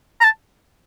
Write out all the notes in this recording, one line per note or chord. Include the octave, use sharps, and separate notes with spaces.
A#5
A5